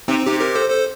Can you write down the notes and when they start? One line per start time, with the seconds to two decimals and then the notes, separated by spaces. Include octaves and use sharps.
0.08 C3 C4 D#4
0.26 C3 D#4 G4
0.41 G4 A#4
0.55 A4 C5
0.70 A4 C5